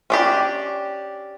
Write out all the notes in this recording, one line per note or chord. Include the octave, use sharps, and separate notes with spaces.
C#4 D4 G4